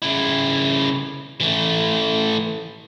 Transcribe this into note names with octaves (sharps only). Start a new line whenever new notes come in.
C#3 E4
E3 A3